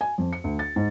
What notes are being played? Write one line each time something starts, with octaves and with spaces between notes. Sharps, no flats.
G#5
F2
C#7
D2
A6
G#2